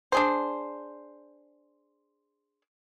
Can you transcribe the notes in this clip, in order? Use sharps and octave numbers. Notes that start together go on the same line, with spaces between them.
D4 G#4 C5